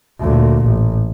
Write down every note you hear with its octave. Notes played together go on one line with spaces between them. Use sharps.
D2 A#2
A1